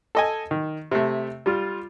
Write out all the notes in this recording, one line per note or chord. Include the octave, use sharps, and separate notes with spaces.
A4 D#5 G#5
D#3
C3 A3
G3 F4